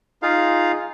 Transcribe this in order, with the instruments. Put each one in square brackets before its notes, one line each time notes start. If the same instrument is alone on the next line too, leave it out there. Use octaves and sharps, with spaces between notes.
[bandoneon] D#4 F4 G#4 F5